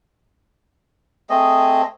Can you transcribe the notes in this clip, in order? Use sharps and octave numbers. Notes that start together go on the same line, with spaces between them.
A3 C4 G#4 D#5